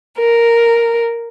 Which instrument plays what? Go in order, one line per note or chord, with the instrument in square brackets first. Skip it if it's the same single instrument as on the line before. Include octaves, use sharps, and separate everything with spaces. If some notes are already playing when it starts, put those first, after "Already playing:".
[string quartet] A#4